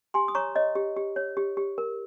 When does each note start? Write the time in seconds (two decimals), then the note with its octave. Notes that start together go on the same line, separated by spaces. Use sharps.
0.14 G4 G#5 C6
0.28 D#6
0.35 C#5 A#5 C#6
0.56 C#5 D#5
0.75 G4
0.97 G4
1.16 C#5
1.37 G4
1.57 G4
1.78 A#4